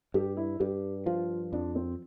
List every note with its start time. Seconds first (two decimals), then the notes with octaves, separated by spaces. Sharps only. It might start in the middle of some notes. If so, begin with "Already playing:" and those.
0.14 G2 G4
0.37 E4
0.60 G2 G4
1.06 F3 F4
1.53 F2 D4
1.75 C4